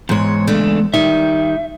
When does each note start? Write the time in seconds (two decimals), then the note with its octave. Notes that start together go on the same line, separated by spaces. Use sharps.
0.09 E2 G#2 G#3 C#5
0.47 C#3 A3 D4
0.94 D#3 G3 D#4 E5